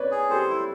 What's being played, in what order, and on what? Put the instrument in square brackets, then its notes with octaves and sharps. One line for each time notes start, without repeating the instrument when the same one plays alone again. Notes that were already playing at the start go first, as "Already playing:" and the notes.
Already playing: [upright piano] B4 C#5 D5
[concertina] G#4
[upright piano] G4 A4 [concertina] C5
[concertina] E4